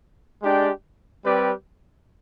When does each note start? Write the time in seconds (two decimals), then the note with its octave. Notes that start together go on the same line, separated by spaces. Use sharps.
0.42 G#3 D4 G4 D5 G5
1.25 G3 C4 G4 B4 D5